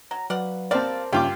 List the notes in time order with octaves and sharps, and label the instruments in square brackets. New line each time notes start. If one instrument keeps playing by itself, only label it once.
[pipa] F#3 [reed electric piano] A#5
[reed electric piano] F#3 B4 [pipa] D5 F5 F#5
[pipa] G3 F5 [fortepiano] C4 D5 [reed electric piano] A#4 C5 A5
[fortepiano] G2 F4 D6 [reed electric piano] C#3 C#4 [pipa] G5